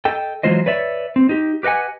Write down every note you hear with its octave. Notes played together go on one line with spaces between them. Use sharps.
A4 D#5 G5
E3 F#3 G#3 F4 C5 D#5
B4 C#5 D5 E5
C4
D#4 G4
G4 B4 D#5 F#5 G#5